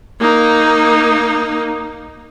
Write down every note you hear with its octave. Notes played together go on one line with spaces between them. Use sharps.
A#3 D#4